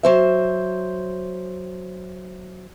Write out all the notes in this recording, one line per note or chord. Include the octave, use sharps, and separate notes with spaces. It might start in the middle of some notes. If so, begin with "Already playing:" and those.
F#3 C5 E5